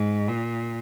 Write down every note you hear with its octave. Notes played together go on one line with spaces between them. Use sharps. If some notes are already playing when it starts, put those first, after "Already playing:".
Already playing: G#2
A#2